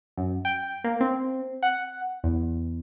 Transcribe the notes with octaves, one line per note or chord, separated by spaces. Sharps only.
F#2
G5
A#3
C4
F#5
E2